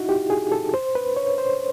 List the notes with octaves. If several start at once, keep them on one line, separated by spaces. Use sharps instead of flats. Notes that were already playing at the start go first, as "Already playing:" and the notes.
Already playing: D#4 E4 F#4
G4
G#4
A4
C5
B4
C#5
C5